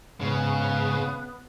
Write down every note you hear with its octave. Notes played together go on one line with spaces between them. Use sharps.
G#2 C#3 B3